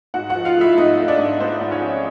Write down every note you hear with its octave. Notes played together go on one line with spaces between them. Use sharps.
G#2 F#4 F#5
F#4 F#5
F3
F4 F5
A3 E4 E5
G#2 D#4 D#5
A3
D4 D5
G#2
G#2 C5
G#2
C#4 C#5
F3